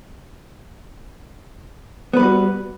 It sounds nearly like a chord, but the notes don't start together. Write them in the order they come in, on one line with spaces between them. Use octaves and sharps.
B3 B4 G3 F#4